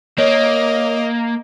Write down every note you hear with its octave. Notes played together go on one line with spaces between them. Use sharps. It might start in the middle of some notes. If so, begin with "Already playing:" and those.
A#3 C#5 D#5